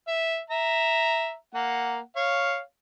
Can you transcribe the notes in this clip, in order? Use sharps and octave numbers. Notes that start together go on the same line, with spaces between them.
E5
E5 A#5
A#3 F#5
C#5 F5